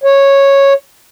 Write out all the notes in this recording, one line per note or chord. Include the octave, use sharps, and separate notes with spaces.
C#5